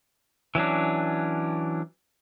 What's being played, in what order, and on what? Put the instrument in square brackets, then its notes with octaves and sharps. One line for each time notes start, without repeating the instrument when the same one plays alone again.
[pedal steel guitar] E3 F#3 C#4 D4